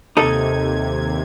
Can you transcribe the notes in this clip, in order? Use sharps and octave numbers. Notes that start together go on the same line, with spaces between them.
D#2 C3 D#4 A4 G#6